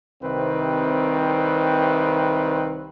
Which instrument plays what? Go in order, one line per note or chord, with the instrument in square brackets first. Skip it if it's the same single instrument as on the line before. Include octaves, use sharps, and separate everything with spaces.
[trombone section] C2 C3 D#3 C4 B4